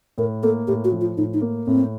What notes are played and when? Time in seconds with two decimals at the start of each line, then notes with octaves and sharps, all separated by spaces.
0.18 A2 A#4
0.43 A#3 A4
0.67 A2 G4
0.84 F#4
0.92 F3
1.01 F4
1.17 A2 D#4
1.34 D#4
1.41 A#3
1.67 A2 C4